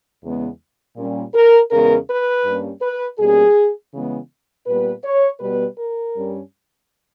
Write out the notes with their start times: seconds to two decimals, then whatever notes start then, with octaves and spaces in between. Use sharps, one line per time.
0.23 E2 C#3 G#3 B3
0.96 A#2 G3 C#4
1.34 A#4
1.70 E2 C#3 G#3 B3 A#4
2.08 B4
2.44 G2 G3 A#3 C#4
2.81 B4
3.18 B2 G3 A#3 C#4 G#4
3.93 C#3 E3 G#3 B3
4.66 A#2 G3 B3 B4
5.04 C#5
5.40 B2 G3 B3 B4
5.78 A#4
6.14 G2 G3 C#4